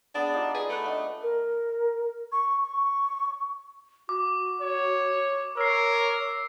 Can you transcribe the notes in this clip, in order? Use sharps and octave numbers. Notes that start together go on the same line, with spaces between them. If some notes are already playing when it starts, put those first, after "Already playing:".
B3 D4 G#4 D#6
D#4 F4 G4
G#4 B4 D5
A3 B5 F#6
D4 D#5 F#5
A#4
C#6
C#6
F#4 D6
C#5
A#4 C#5 E6 C7